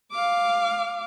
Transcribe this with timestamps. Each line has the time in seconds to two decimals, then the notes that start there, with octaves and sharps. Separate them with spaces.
0.12 F5 D6